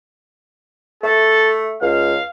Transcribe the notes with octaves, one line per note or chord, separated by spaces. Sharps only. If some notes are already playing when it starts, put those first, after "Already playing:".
A3 A4
C#2 F5